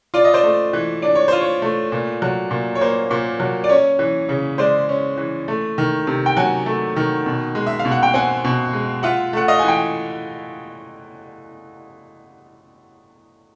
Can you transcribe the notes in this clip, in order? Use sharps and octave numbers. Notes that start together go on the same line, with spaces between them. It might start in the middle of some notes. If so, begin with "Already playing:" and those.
F4 D5
D#5
C5 D5
A3
E3
D4 D5
C#5
F4 C5
C#5
A3
A#2
F#3
A#2
C#5
A#3 C5
A#2
F#3
D5
C#4 C#5
E3
C#3
G#3 C5 D5
C#4
E3
A3
D#3
C3
G5
F#3 F#5 G#5
A3
D#3
B2
G#3
E5
F5
B2
F#5
G5
C4 F#5 G#5
B2
G#3
F4 E5 F#5
A3 F#5
D#5 F5
G#5
E3
G5